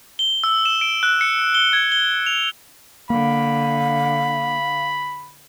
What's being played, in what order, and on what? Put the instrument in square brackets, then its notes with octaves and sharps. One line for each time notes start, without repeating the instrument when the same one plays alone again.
[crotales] G7
E6
E7
D7
F#6
C#7
G7
G#6
G7
F7
[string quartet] D3 [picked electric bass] A#3 [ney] F5 [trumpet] B5